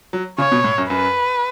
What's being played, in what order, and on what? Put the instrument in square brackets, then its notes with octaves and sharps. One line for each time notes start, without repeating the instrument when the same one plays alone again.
[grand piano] F#3
[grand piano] C#3 [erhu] C#5
[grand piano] B2
A2
F#2
[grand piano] F#2 [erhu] B4